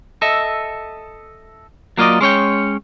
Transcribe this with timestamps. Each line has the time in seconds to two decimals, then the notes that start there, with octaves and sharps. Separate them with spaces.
0.22 A4 D#5 E5
1.98 F#3 A#3 F4 D5 D#5
2.21 G#3 C#4 C#5 G5